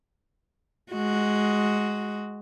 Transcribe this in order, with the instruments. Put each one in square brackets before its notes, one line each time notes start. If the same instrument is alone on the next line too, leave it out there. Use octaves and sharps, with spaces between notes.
[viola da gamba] G#3 F#4